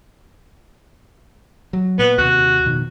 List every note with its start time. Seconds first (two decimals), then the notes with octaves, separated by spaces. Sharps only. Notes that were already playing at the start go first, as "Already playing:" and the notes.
1.73 F#3
1.99 A#2 B3
2.18 D#2 C3 F#4
2.65 F2 B2 D#3